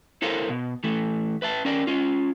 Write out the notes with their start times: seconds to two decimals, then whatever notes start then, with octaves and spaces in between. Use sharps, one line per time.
0.22 E4 A4 A#4 C5 C#5 F5
0.49 B2
0.84 E3 A3
1.42 B4 E5 A5
1.65 C#4 A#4 D5
1.87 C#4 F4